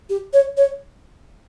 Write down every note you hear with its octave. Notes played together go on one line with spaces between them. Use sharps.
G4
C#5
C#5